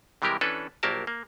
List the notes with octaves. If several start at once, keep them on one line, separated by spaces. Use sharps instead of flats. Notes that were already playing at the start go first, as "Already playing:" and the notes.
C3 E3 G3 G#3 G4 A#4
E3 C#4 D4 A4 B4
A#1 F#3 A#3 G4 A#4 A5
A#3